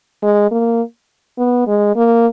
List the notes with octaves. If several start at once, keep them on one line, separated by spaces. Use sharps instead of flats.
G#3
A#3
B3
G#3
A#3